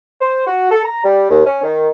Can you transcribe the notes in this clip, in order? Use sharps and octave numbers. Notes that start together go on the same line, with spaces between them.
C5
F#4
A4
A#5
G3
D#2
C#4
D#3